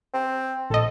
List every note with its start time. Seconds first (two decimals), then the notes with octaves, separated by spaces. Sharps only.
0.14 C4
0.70 A#1 A4 D#5